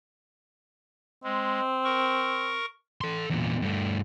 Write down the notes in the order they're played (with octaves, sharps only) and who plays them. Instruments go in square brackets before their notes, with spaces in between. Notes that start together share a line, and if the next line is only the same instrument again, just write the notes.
[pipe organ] G#3 [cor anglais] C4
[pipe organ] A#4 C#6
[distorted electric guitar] A4 C6
E2 A#2
G2 A3